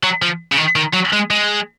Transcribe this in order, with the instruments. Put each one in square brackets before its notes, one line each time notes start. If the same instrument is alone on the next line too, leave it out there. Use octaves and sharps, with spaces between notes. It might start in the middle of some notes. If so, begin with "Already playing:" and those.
[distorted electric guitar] F#3
F3
C#3
D#3
D#3
F#3
G#3
G#3